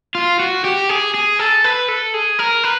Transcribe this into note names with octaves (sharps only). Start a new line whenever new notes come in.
F4
F#4
G4
G#4
G#4
A4
B4
A4
G#4
A#4
B4